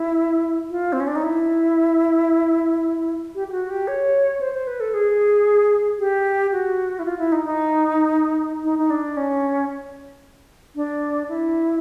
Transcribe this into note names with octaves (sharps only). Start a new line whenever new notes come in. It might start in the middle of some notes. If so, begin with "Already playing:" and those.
Already playing: E4
F4
C4
C#4
D4
D#4
E4
G4
G4
F#4
G4
C#5
C5
C5
B4
A4
G#4
G4
F#4
E4
F4
E4
D#4
D#4
D#4
D#4
D4
C#4
D4
E4